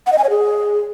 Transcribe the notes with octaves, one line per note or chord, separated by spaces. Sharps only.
F#5
D#5
G#5
C#5
G#4